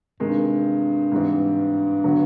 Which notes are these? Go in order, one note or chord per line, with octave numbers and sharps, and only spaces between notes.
G2 C3 D#3 G#3
G#2 E3 G3 C4
D3 F#3 B3